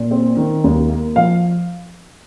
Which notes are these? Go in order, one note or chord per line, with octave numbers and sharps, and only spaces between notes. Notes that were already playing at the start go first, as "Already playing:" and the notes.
Already playing: A#2
C4
D#3
D#2
A#3
F3 F5